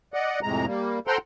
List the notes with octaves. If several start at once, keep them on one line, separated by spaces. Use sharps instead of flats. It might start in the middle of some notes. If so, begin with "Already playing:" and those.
D5 D#5 F#5
F2 A2 C3 G#3 A#5
G3 A#3
A4 C5 F#5 G5 A#5 C6